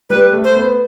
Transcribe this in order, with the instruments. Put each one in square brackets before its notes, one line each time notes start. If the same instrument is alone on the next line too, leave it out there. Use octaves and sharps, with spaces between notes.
[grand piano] G3 [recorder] B4
[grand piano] A3
[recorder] C5
[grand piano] B3